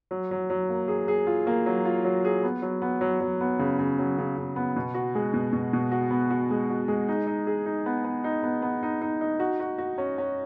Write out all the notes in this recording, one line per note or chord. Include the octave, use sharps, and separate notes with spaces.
F#3
F#3
F#3
A#3
G#4
G#4
F4
A#3
F#3
F4
F#3
G#4
B3
F#3
B3
F#3
F#3
B3
C#3
C#3
F#3
C#3
C#3
B3
B2
F#4
G#3
B2
B2
B2
F#4
B3
F#4
G#3
F#4
G#3
D#4
D#4
G#4
D#4
B3
B3
D#4
B3
B3
D#4
D#4
D#4
F#4
F#4
F#4
C#4
C#4